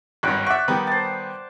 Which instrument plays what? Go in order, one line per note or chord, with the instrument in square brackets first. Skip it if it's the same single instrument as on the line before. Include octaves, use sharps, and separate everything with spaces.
[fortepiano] G#1 G2 [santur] C#5 F#5 G5
[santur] D5 F#5 [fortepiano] E5 C#6
[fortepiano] D#3 G3 B3
[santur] C5 A5